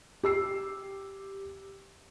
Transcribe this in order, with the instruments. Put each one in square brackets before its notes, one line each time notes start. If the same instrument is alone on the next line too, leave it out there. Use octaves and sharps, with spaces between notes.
[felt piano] G4 E6 C7